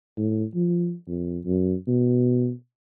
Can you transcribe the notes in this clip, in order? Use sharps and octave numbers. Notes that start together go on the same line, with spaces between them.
A2
F3
F2
F#2
B2